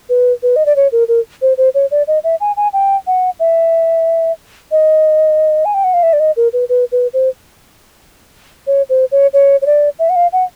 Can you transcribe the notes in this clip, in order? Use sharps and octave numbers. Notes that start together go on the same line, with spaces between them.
B4
B4
D#5
D5
C#5
A#4
A#4
C5
C5
C#5
D5
D#5
E5
G#5
G#5
G5
F#5
E5
D#5
G#5
G5
F#5
F5
E5
D5
D#5
A#4
B4
B4
B4
C5
C#5
C5
C#5
C#5
C#5
D5
E5
F#5
F5
F#5